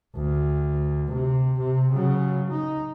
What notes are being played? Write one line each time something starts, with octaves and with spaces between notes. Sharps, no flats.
D2
C3
C3
C#3 F#3
D#4